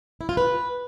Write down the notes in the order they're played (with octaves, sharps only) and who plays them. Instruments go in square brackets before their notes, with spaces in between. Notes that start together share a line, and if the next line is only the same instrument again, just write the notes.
[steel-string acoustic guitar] E4
F4
B4